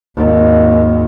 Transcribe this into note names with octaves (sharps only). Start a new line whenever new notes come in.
G#1 D#2